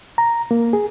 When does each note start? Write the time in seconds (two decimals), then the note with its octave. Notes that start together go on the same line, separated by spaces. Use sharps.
0.18 A#5
0.51 A#3
0.73 G#4